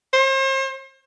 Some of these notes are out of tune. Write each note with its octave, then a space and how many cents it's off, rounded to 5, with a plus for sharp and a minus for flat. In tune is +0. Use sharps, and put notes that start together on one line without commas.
C5 +40